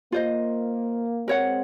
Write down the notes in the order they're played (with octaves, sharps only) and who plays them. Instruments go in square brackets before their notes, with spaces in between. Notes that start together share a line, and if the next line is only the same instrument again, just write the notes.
[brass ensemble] A#3 [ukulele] F4 C5 D#5
[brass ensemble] G#3 C4 [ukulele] A#4 C#5 F#5